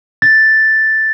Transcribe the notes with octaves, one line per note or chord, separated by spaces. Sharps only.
A6